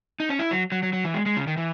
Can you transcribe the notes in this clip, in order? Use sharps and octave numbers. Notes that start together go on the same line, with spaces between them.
D#4
C#4
E4
F#3
F#3
F#3
F#3
E3
G#3
G#3
C#3
D#3
E3